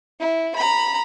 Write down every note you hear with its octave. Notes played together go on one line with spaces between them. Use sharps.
E4
A#5 B5